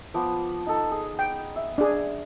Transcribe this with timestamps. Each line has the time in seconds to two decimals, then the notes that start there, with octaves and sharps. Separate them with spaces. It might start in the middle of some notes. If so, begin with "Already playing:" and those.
0.14 F3 B3 D6
0.67 D#4 A4
0.91 G#4
1.19 G5
1.56 E5
1.78 D4 G#4